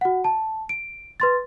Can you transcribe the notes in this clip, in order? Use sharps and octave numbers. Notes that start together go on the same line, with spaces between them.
F#4 F#5
A5
D7
B4 C6 A6